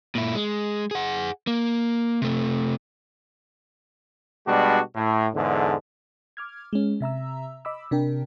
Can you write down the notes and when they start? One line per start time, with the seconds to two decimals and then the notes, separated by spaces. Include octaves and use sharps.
0.15 A#2 E4
0.35 G#3
0.91 G#4 F#5
1.47 A#3
2.22 C3 A3
4.47 B2 G3 G#3 D4 F#4
4.96 A2
5.35 E2 G#2 D3
6.37 D6 F6 G#6
6.73 G#3 C#4
7.01 C3 E5 A#5 E6
7.65 D#5 B5 D6 E6
7.91 C3 D4 A#4 G5